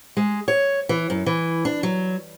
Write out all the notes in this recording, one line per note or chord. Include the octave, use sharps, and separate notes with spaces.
G#3
C#5
E3
F#2
E3
D4
F#3